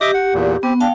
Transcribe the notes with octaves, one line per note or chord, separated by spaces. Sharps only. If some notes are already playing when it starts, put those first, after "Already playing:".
G4 D#5 E5 D6
F#5
E2 A#2
B3 C4 G4
D4 F5 G5 A5